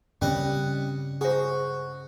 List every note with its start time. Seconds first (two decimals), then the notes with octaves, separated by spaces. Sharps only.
0.22 G2 C#3 G3 C4 C#4 D#5 F#5
1.21 F#4 G#4 C5